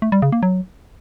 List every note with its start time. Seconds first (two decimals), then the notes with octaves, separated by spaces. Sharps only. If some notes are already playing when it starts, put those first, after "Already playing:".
0.02 A3
0.12 G3
0.22 C#3
0.32 A#3
0.43 F#3